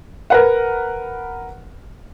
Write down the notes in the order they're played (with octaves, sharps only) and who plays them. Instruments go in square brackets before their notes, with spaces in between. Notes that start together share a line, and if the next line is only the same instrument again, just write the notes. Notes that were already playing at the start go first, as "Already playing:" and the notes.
[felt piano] A#4 B4 F#5